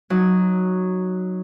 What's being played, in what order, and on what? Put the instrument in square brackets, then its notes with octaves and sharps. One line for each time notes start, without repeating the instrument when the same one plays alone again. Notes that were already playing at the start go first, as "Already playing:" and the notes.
[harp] F#3 D#4